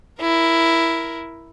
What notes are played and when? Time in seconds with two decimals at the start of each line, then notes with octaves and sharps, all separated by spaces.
0.21 E4 A#4